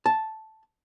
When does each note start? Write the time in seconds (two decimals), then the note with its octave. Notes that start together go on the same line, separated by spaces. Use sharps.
0.06 A5